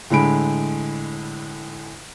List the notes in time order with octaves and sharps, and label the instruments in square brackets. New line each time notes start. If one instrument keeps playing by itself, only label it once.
[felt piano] A2 D3 G#3 B5 D7